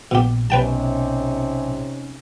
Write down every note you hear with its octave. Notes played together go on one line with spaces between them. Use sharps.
A#1 B2 G4
B1 C3 C#4 D#4 B4 G5 A5